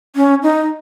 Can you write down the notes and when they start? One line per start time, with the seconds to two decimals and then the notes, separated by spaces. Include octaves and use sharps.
0.16 C#4
0.43 D#4